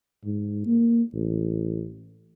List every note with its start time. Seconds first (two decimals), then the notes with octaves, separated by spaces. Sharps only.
0.25 G#2
0.66 A#3
1.14 A1